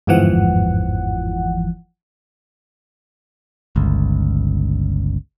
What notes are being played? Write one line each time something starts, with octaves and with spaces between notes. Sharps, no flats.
G1 E2 G#2 E3 F3 F#5
G1 C#2